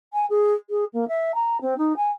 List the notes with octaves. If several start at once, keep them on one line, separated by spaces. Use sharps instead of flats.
G#5
G#4
G#4
A#3
E5
A#5
C4
D#4
G#5